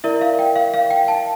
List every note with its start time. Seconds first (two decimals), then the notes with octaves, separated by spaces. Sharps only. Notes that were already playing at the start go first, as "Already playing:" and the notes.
0.04 E4 A#4 D5 E5
0.21 F5
0.39 G5
0.56 F5
0.74 F5
0.90 G5
1.08 A5